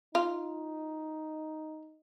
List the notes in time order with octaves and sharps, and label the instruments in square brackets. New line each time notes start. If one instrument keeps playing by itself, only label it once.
[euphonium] D#4 [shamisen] F4